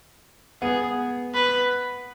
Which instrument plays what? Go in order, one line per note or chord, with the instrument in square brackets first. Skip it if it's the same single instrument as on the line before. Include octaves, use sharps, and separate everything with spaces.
[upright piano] B3 [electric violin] G#4
[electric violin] B4